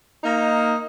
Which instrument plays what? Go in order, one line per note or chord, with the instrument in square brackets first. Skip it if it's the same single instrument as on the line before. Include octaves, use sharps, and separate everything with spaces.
[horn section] A#3 D#4